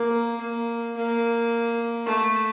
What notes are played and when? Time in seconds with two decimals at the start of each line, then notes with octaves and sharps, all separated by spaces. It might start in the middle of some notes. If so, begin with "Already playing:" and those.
Already playing: A#3
0.41 A#3
0.97 A#3
2.06 A3